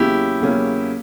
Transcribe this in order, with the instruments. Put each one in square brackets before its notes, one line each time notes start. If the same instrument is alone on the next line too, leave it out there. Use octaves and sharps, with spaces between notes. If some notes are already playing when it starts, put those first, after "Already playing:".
Already playing: [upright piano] E2 C#3 F#3 A#3 C#4 [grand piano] E4 G4
[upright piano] E2 C#3 F#3 A#3 C#4